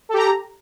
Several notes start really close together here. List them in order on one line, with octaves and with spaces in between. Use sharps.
A4 G4 A#5